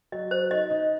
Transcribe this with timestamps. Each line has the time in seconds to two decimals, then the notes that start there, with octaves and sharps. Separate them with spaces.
0.12 F#3 D#5
0.31 F#3 C5
0.50 D#4 D#5
0.70 D#4